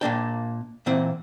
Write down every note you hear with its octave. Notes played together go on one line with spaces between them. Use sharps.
A#2 A#3 D4 G5
A#2 E3 C4 F#5